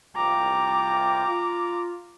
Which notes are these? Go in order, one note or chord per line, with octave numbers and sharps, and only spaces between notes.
C2 F4 G5 A#5 D6
F4